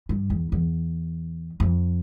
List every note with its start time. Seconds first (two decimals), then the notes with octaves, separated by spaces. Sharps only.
0.09 G2
0.30 E2
0.52 E2
1.60 F2